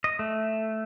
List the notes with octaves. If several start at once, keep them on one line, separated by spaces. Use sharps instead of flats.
D#5
A3